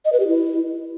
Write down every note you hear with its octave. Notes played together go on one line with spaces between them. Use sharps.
D#5
B4
G4
E4